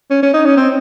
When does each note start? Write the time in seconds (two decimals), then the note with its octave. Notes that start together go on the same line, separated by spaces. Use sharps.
0.10 C#4
0.23 C#4
0.34 D#4
0.46 C#4
0.57 C4